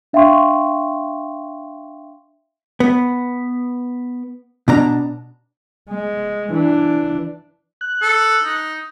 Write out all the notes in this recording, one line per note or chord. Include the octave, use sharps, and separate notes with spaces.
D4 E5 F5 G5 C6 C#6
B3
B2 D4 A#5
G#3
E3 D4
F#6
A4
D#4